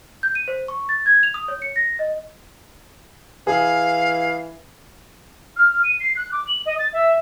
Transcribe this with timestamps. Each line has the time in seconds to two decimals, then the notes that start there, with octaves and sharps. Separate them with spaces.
0.23 G6
0.35 D#7
0.48 C5
0.68 C#6
0.89 A6
1.06 G#6
1.23 F7
1.34 D#6
1.48 C#5
1.62 C#7
1.76 A#6
1.99 D#5
3.47 E3 G#4 F5
5.56 F6
5.83 D#7
6.00 C7
6.16 F#6
6.32 D6
6.47 F#7
6.65 D#5
6.79 A6
6.93 E5